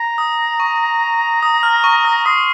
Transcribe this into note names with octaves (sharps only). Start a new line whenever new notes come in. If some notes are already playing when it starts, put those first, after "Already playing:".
Already playing: A#5
D#6
C#6
D#6
F6
C#6
D#6
C6 D#6